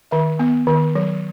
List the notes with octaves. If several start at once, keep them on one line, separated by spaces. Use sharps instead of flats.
D#3 E5
B3
D#3
F#3